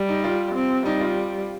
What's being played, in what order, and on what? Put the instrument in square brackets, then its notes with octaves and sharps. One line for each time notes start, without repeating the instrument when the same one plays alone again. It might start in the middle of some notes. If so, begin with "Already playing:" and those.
Already playing: [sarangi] G3
[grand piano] D#4
F4
[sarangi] C4
[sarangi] G3 [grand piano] D#4
[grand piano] F4